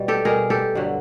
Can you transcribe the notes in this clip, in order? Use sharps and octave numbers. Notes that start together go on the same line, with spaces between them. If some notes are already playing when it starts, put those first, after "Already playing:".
Already playing: B2 G3
G4 A4
B2 G3 G#4 A#4
G4 A4
G2 D3 F#3